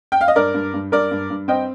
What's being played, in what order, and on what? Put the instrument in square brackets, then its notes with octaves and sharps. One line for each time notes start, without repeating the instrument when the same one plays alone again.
[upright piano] G5
F5
D#5
G2 A#4 D5
G2
G2
G2 A#4 D5
G2
G2
C4 D#5 G5